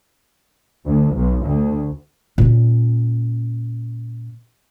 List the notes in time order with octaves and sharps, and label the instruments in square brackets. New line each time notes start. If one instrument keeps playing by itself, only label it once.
[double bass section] D2
B1
D2
[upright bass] A#2 C#4